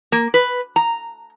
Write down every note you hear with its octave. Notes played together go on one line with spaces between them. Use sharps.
A#3
B4
A#5